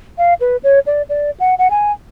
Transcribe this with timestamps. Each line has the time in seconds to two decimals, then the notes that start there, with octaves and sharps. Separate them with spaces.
0.18 F5
0.41 B4
0.63 C#5
0.86 D5
1.09 D5
1.40 F#5
1.59 F#5
1.70 G#5